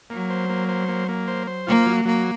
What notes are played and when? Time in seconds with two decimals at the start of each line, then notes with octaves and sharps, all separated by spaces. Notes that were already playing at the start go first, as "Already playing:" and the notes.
0.10 F#3 A#3
0.30 C5
0.49 A#3
0.68 C5
0.88 A#3
1.08 A#3
1.28 C5
1.47 C5
1.67 A#3 F4
1.86 F#3
2.05 F#3 A#3